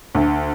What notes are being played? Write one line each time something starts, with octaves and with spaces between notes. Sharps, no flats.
D2